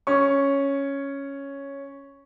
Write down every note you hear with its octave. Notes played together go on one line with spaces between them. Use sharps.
C#4 C#6